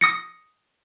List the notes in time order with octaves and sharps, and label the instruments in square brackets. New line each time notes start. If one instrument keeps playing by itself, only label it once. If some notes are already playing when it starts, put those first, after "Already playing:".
[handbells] D#6 A#6 C#7